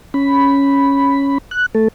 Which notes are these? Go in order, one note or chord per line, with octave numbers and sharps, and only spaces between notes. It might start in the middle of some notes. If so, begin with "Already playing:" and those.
C#4 B5
F#6
A3 A4